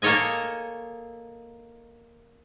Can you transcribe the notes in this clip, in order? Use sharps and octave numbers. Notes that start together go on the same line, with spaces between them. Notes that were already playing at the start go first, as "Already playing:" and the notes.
A#3 A4 C#5 D#5 G#5